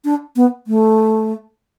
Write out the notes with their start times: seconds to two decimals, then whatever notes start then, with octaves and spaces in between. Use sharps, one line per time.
0.05 D4
0.36 B3
0.67 A3